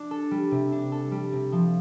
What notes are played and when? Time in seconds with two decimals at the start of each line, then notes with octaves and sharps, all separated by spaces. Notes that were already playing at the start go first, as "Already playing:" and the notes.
Already playing: D4
0.11 A4
0.31 G3
0.51 C3
0.72 D4
0.92 A4
1.11 G3
1.32 C3
1.52 F3